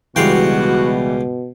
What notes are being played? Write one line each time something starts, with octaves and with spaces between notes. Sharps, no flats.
C#2 B2 E3 G3 F#4 F5 G5